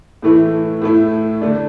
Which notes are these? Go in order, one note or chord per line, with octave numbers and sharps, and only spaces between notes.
A2 E3 A3 E4
A2 A3 E4
D3 A3 D4